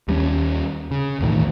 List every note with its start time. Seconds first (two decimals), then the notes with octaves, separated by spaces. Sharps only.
0.08 D#2 G3 G#3 C#4
0.91 C#3
1.20 B1 E2 A2 D#3